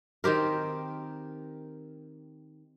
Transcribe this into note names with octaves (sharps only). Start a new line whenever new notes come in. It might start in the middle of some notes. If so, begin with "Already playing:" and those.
D#3 C4 G4 A#4